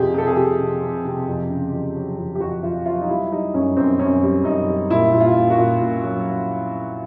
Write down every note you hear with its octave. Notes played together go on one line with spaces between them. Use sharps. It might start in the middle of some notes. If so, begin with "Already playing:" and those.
Already playing: F2 C3 F3 G4 G#4
C3 A4
G#4
C3 G4
C3
C3
C3
F2
C#3
F2
F#3
F2
G4
F2 F#4
F2 F4
F#3 F4
D#4
G3 E4
G3 D#4
F#2 C#4
F#2 C4
F#2 C#4
G3
F#2 D#4
G3
A#2 E4
A#2
F4
A#2
F#4
A#2
A#2
F#3